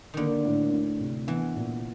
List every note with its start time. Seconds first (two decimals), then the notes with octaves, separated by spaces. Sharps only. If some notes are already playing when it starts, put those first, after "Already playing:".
0.14 D3 D#3 A#3
0.45 A2
0.72 D2
1.00 C3
1.27 E3 B3
1.55 A#2